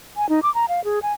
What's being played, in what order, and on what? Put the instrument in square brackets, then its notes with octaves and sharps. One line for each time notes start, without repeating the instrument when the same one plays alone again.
[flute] G#5
D#4
D6
A#5
F5
G#4
G#5